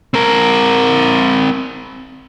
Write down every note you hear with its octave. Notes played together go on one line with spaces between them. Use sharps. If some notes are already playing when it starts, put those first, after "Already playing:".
C4 A#4